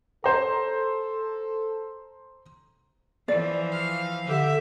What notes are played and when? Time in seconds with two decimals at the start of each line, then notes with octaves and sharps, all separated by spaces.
0.24 A4 C5 A#5
3.28 E3 F3 D5
3.72 F5
4.27 D3 G4 E5